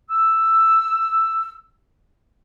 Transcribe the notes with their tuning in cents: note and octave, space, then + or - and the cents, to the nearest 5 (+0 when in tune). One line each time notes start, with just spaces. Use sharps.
E6 +5